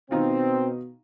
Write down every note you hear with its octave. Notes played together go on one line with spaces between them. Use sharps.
B2 D#3 C4 D#4 F4